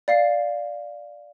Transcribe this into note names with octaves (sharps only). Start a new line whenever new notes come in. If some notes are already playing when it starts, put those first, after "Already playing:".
D5 F5 C7